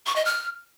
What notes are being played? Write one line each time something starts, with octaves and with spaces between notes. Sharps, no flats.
C#6
D#5
F6